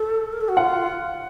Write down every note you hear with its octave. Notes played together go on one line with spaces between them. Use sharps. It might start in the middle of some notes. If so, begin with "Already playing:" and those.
Already playing: A4
A#4
A4
F#4
F4 F#5